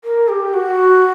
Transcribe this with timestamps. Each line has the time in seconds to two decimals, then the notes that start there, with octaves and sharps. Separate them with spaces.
0.04 A#4
0.28 G4
0.54 F#4